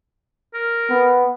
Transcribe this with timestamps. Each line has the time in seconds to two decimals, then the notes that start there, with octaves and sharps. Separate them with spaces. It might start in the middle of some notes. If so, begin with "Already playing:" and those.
0.54 A#4
0.90 B3